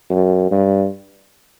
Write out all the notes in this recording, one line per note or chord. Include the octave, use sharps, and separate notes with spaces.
F#2
G2